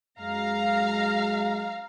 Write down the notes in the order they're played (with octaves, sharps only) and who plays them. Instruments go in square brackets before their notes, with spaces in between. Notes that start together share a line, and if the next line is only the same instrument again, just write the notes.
[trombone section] F#2 G#3 [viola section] F5 A#5